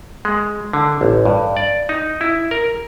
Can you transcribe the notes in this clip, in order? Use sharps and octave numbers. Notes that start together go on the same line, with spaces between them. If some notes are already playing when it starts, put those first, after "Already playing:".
G#3
D3
A1
G2
D5
D#4
E4
A#4